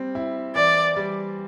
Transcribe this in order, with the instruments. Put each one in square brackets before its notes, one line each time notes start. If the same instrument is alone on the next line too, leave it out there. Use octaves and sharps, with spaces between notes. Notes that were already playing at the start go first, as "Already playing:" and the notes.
Already playing: [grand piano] G3 C4
E4
[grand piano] E3 [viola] D5
[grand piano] G3